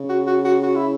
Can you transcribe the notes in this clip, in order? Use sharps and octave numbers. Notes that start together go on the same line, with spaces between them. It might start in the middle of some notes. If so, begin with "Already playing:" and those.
Already playing: C#3
F#4
F#4
F#4
F#4
E4